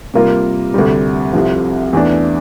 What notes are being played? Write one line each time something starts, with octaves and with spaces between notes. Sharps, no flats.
C3 G3 A#3 F4 A#4
D2 C3 G3
C2 C3 F3
E2 E3 A3 D4